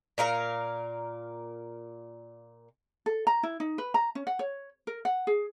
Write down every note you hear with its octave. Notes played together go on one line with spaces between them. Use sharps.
A#2 A#4 F5 A#5
A4
A#5
E4
D#4
B4
A#5
C#4
F#5
C#5
A#4
F#5
G#4